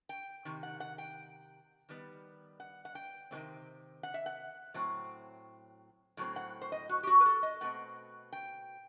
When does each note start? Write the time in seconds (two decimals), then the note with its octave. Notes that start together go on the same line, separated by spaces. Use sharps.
0.09 G5
0.45 C3 D#3
0.63 F#5
0.80 F#5
0.98 G5
1.89 D#3 G3 B3
2.60 F#5
2.85 F#5
2.95 G5
3.31 C3 D#3 F#3 A3 C4
4.03 F#5
4.14 E5
4.26 F#5
4.74 A2 F#3 C4
6.17 A2 F#3 C4
6.36 F#5
6.62 C5
6.72 D#5
6.89 F#4
7.03 G4
7.07 F#4
7.20 B4
7.26 A4
7.43 D#5
7.61 B2 A3 C4 F#5
8.33 G5